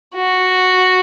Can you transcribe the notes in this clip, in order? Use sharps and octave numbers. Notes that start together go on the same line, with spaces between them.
F#4